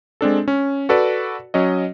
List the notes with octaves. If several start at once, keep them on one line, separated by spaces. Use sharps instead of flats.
G#3 C4 D4 A4
C#4
F#4 A4 B4 D5
F#3 C#4 D#5